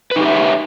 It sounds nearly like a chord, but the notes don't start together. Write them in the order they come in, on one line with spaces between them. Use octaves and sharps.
B4 D#4 G4 E5 C#5